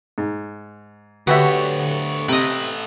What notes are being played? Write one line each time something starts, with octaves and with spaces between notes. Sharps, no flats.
G#2
D2 D3 B3 F#4 G4 C#5 E5
C3 A3 B4 D#5 G5